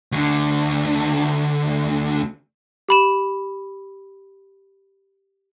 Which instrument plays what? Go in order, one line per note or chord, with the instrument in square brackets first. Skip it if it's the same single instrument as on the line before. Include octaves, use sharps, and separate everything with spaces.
[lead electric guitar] D2 D3
[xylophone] G4 B5 E7